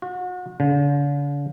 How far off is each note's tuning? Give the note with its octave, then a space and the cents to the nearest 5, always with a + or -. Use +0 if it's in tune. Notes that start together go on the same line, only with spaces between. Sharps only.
F#4 -35
D3 -45